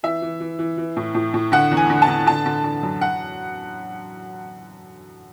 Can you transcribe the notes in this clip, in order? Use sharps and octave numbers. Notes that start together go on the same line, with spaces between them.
E3 E5
E3
E3
E3
E3
A2
A2
A2
D3 F#5
E2
G#5
D3
A5
D3
D3 A5
D3
D3
F#2
F#5